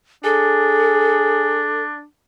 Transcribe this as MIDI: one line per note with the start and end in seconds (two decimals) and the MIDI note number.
0.24 2.04 62
0.24 1.66 68
0.24 1.83 69